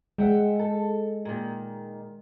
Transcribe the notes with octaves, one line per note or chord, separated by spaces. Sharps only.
G#3 E5 F#5 G5
A4
A#2 D#3